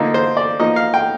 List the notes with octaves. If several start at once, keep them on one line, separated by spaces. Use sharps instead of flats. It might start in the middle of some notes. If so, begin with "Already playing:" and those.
Already playing: D3 F3 A#3 D#4
C5
D5
F3 A#3 D#4 D#5
F5
G5